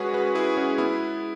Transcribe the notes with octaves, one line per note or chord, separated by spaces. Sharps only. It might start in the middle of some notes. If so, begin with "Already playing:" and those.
Already playing: G#3 C#4 F#4 G#4 B4 C#5
F#4 B4
E4 G#4
C#4 F#4
B3 E4